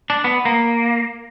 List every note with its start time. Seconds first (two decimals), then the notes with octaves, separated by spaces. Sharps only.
0.10 D4
0.24 B3
0.45 A#3